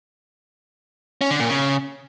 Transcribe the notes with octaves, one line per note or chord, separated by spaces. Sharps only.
C#4
D3
A#2
C#3